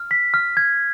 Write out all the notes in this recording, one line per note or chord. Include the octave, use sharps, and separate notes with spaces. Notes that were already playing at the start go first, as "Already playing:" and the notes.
Already playing: F6
B6
F6
G#6